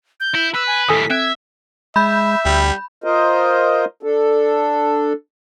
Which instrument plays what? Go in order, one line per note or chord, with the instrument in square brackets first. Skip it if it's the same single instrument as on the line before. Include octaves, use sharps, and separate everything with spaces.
[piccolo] G6
[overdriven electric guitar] E4
[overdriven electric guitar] B4 [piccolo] E6
[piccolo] G#5
[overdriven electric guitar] D#2 A2 [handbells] A4 G#5 D#6 [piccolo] B6
[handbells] C4 F#6 D7 [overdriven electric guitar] E5 [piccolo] G#6
[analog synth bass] G#3 [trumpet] E5 [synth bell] B5 G6
[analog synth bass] D2 [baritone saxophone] G3
[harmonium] F4 A#4 C5 D#5
D4 A4